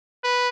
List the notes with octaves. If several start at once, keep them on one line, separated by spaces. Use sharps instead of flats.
B4